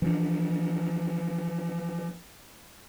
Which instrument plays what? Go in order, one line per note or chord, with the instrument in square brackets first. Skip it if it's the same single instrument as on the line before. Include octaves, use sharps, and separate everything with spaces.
[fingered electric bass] E3 F3 D4